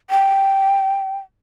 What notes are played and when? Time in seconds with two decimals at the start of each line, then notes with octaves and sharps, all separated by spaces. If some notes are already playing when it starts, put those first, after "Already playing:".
0.10 G5